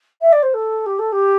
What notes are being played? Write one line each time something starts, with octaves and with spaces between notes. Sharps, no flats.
E5
D5
C5
A4
G4
A4
G4